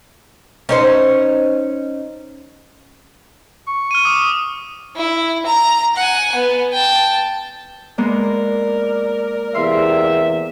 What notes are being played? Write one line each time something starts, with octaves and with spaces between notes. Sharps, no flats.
C#4 D#4 C5
C#6
F6 D#7
D6 D#6
E4
A#5
F#5 G#5
B3
G5 A5
G#3 A#3 B3 A#4 D5
E2 C3 E5 F5 C6